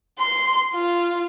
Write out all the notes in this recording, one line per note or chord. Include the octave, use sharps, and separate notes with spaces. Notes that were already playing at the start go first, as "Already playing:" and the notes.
C6
F4